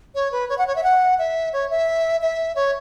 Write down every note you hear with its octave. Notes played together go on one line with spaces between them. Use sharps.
C#5
B4
C#5
F#5
C#5
E5
F#5
E5
C#5
E5
E5
C#5